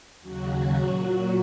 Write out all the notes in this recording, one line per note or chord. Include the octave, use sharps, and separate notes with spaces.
D#2 C#3 F#3 F#4
A#2 F#3 F#4